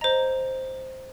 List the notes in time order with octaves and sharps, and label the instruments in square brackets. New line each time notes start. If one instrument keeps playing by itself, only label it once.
[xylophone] C5 D#5 A#5